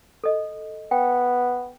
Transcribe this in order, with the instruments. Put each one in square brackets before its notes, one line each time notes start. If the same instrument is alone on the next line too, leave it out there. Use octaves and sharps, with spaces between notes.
[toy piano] A4 D#5
[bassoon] B3 [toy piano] G5